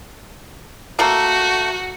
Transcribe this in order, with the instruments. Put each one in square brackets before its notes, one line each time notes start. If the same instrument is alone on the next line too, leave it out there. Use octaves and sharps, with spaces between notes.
[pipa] A3 A#3 [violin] F#4